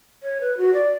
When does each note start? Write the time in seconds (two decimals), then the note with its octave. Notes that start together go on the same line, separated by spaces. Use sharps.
0.23 C#5
0.41 B4
0.57 F#4
0.74 D5